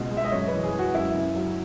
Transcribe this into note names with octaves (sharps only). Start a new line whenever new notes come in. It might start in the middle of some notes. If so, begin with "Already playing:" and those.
Already playing: C#2 B2 G#3
G#3
E5
D#5
F#2 C#5
B4
E3
G#4
G#3
F#4
F#2 E4
C#3
F#3